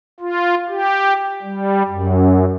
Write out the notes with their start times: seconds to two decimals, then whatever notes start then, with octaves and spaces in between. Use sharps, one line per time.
0.20 F4
0.69 G4
1.43 G3
1.89 F#2